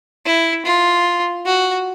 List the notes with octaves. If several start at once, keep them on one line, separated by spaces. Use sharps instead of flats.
E4
F4
F#4